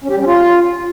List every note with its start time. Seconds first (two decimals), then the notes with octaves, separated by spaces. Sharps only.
0.04 C#4
0.10 G4
0.15 G3
0.21 C#4
0.27 F4